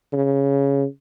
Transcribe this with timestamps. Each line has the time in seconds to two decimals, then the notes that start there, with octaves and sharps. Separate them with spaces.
0.13 C#3